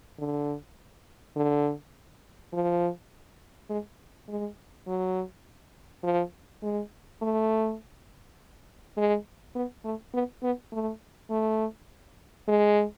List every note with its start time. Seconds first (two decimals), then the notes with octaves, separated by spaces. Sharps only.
0.19 D3
1.36 D3
2.53 F3
3.70 G#3
4.29 G#3
4.87 F#3
6.04 F3
6.62 G#3
7.22 A3
8.97 G#3
9.55 B3
9.85 A3
10.14 B3
10.43 B3
10.72 A3
11.31 A3
12.48 G#3